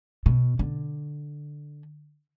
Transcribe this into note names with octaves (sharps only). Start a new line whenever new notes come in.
B2
D3